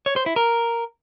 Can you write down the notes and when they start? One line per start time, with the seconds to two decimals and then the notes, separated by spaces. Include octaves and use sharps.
0.06 C#5
0.16 C5
0.26 E4
0.36 A#4